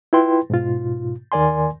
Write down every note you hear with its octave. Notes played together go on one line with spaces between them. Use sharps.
E4 F4 B4 G5 C6
G#2 B2 F4
D#2 D#3 A#4 D5 G#5 C6